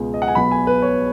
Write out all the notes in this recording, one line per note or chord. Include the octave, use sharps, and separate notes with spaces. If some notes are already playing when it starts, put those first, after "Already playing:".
Already playing: C#2 B2 G#3 B3
D#5
F#5
G#5
B1 B2 B3 B5
G#5
B4
C#5